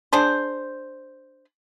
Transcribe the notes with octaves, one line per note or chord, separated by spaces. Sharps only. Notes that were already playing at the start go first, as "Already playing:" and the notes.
D4 G#4 C5